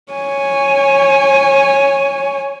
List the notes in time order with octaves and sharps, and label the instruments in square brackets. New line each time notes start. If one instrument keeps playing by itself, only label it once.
[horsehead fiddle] C#5 G#5